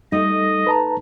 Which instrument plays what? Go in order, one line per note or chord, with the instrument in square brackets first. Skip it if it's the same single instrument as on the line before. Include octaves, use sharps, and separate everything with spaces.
[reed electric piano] G3 [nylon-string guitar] A3 D#4 [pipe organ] D#5
[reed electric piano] B4 A5 A#5